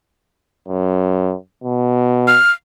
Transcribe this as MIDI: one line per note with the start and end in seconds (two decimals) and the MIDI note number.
0.68 1.34 42
1.64 2.37 47
2.27 2.51 89